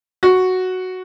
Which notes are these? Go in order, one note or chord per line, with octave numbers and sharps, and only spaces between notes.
F#4